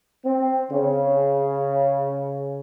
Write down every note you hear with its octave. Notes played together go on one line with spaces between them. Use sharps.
C4
C#3